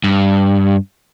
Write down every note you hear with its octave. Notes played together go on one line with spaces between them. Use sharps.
G2